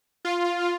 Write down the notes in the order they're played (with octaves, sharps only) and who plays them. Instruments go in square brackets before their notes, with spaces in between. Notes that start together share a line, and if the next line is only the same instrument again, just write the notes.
[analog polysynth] F4